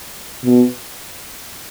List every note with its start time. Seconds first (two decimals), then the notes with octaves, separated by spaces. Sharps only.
0.45 B2